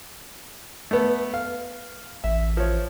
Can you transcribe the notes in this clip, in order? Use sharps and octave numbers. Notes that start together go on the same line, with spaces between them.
A3 B3
F5
A1 E5
F3 C#5